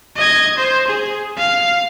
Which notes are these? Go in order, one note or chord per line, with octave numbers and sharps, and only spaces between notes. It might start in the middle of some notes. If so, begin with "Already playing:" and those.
D#5 G#6
C5
G#4
F5